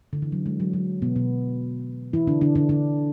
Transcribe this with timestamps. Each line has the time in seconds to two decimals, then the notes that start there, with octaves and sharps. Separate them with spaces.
0.13 D3
0.22 E3
0.32 F#3
0.46 G#3
0.60 F#3
0.73 F#3
1.02 B2 B3
1.16 B2 B3
2.13 E3 E4
2.27 D3 D4
2.41 D3 D4
2.55 D3 D4
2.69 D3 D4